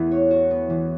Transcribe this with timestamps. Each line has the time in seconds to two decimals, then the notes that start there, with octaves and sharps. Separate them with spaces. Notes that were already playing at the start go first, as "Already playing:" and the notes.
Already playing: E2 E3 A3 B3 E4
0.11 C#5
0.31 F#4
0.51 B3
0.70 E3